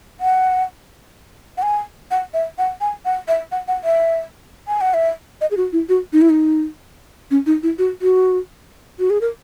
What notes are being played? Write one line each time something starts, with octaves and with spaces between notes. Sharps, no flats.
F#5
F#5
G#5
F#5
E5
F#5
G#5
F#5
E5
F#5
F#5
E5
G#5
F#5
E5
D#5
G#4
F#4
E4
F#4
D#4
E4
D#4
C#4
D#4
E4
F#4
F#4
F#4
G#4
A#4